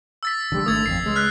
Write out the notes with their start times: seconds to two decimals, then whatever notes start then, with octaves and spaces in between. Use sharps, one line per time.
0.23 E6 A6 B6
0.52 D3 G3
0.66 G#1 D3 A3 D#6 G#6 A6
0.86 G#1 F2 C7
1.03 C#2 G#3
1.16 F6 F#6 B6